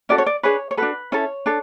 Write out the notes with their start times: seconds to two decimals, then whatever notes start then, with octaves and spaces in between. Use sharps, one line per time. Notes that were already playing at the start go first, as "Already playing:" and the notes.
0.09 C#4 F#4 A4 D5
0.18 C#5
0.26 D5
0.43 D4 G#4 B4 C#5
0.71 C#5
0.77 D4 F#4 A4 B4
1.12 C#4 E4 A4 C#5
1.46 D4 A4